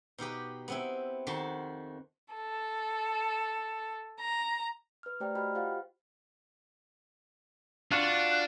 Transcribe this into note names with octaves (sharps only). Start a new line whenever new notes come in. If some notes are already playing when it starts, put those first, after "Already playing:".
B2 D#4 G4 B4
B3 C4 E4
F2 D#3 F#4 A5 C6
A4
A#5
B4 F6
A3 G4 C5 D5 G5 A#5
F#4 G4 D#5 G5 B5 F6
F4 G4 C5 F5 F#5
D4 F4 F#4 F#6